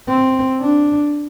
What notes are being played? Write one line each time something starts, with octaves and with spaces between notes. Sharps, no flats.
C4
D4